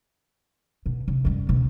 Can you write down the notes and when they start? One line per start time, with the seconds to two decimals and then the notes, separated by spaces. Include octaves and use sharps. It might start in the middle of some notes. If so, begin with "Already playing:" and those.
0.86 B2
1.08 C3
1.25 F#2 G3
1.49 C#2 B2